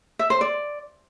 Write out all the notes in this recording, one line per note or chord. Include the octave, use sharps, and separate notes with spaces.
E5
C5
D5